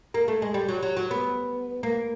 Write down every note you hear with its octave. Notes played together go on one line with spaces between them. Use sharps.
A#3
A3
G#3
G3
F#3
F#3
F#3
B3
A#3